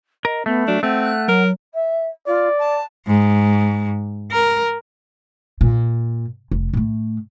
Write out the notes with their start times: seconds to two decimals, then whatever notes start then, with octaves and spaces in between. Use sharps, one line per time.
0.25 A#4 D#5
0.46 A3 B3
0.68 F#3 D4
0.83 A3 C4 F#5
1.02 F#6
1.28 F#3 A#4
1.74 E5
2.27 F4 D5
2.59 A5
3.07 G#2
4.31 A#4
5.61 A#2
6.51 F1
6.73 A2 A3